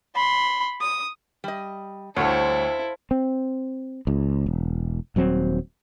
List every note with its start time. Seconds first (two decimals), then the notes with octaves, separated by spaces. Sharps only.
0.15 B5 C6
0.81 D#6
1.44 G3 D#5
2.16 D2 G3 E4 A4 C5 C#5 F5
3.11 C4
4.07 C#2
4.46 E1
5.16 D#1 F#3 C4